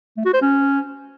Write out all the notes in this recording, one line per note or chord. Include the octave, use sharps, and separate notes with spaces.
A3
F#4
C5
C#4